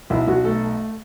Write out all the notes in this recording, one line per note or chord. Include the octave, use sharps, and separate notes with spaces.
B1 E4
B1 F#4
A3 A4